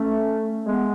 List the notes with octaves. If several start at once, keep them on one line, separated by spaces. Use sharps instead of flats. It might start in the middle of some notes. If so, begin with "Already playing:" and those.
Already playing: A3 C#4
G#3 B3